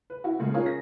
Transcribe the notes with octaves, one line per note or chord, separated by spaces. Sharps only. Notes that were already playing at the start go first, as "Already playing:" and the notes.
B4
E4 F#4
A#2 C#3 G#3 A3
C#4 D#4 F4 G#4 A#4 C#5
A#6